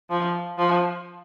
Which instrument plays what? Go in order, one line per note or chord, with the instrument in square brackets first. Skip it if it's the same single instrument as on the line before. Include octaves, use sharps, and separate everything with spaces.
[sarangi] F3
F3